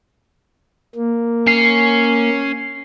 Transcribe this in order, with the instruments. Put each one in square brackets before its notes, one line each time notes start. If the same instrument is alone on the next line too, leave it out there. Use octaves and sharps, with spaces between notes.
[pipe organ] A#3
[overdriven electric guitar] C#4 [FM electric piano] C7